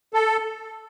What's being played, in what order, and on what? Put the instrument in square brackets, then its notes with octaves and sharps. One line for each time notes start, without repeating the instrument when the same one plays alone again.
[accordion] A4